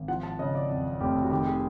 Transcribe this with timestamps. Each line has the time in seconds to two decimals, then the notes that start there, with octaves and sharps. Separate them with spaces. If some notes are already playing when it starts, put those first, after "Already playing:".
Already playing: G#1
0.08 F3 F#5
0.23 A5
0.39 C#3 D#5
0.55 D5
0.69 F2
1.01 F1 G4
1.23 F#4
1.30 D#3 G4
1.46 G#4